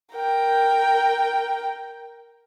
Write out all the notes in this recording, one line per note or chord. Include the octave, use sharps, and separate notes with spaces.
A#4 G5